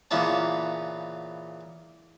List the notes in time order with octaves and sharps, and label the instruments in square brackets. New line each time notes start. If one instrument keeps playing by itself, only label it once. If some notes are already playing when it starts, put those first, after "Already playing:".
[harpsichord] A#2 C#3 E3 B3 C#4 A5